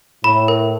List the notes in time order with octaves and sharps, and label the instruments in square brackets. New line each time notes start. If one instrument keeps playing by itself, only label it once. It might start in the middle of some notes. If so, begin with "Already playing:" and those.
[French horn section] A2 [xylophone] B5
[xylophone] A#4